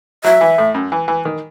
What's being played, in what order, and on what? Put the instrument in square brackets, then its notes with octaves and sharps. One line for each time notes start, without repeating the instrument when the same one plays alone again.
[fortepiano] F#3 [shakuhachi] E5
[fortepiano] E3
A2
F#2
E3
E3
D#3